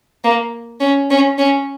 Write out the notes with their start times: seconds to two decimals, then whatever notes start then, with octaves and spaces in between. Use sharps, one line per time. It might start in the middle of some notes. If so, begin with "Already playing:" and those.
0.24 A#3
0.80 C#4
1.10 C#4
1.38 C#4